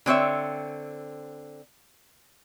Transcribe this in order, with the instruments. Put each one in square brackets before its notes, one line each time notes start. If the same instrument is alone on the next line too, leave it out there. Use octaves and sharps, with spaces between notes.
[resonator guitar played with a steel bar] D3 C4 C#5 E5